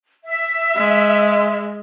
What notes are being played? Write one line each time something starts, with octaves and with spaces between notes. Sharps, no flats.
E5
G#3